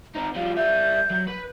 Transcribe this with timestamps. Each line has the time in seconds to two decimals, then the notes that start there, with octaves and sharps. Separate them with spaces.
0.15 C4 D#4 A#5
0.35 F3 G3 F5
0.57 G3 E5 G6
1.10 F#3
1.27 B4